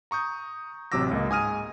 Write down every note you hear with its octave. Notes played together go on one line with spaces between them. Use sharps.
A#5 C#6 D#6 G6
A1 C3 F#3 D6 E6 A#6
C#2 A#3 D#5
G#2 G#5 D#6 F6 D#7